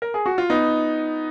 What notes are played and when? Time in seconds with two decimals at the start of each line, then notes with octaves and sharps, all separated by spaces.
0.02 A#4
0.14 G#4
0.26 F#4
0.38 F4
0.50 B3 D#4